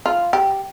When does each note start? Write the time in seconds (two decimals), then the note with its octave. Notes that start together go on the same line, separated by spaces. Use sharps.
0.06 F4
0.33 G4